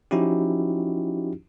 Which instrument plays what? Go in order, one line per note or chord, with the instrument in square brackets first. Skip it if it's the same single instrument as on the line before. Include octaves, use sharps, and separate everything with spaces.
[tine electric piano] F3 C#4 D#4 E4 F#4 G4